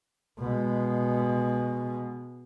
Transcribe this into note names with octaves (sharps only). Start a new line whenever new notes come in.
B2 G#3